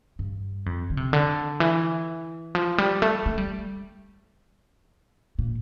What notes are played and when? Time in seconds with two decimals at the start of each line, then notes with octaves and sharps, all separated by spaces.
0.19 G2
0.66 F2
0.90 D3
0.97 C3
1.13 D3
1.60 E3
2.55 F3
2.78 G3
3.02 A3
3.26 A3
3.38 G3
5.39 A#2